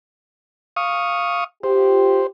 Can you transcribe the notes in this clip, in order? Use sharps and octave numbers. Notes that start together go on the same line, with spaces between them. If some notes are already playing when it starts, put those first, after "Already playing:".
F5 C#6 D#6
F4 G4 C5